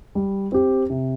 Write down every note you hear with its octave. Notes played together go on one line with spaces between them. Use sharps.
G3
C4 G4
C3